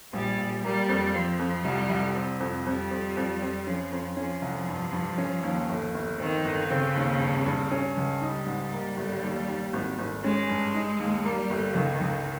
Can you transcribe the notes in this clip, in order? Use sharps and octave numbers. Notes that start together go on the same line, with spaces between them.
A#1 G3
A#1
G3 A#3
F2
F3 C4
F2
C2 G3
C2
C4
F2
F2 G3
F2
F2
F2
F3 C#4
F2
F3 C#4
C2
G2
G2
C#4
D#2
G1
G1
D#3 C4
G1
C#3 C4
D#2
G2
G2
C#4
C#2
G3 D#4
G#2
A#3
G1
D#2
D#2
G#1
G#1
G#3 C#4
G2
D#4
D#2
G3 A#3
G1
C#2 D#3
C#2